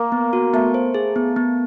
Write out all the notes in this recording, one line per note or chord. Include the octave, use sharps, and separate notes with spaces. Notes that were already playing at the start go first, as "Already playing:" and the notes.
Already playing: A#3
B3
F#4
A3 B3
C5
G#4
B3
B3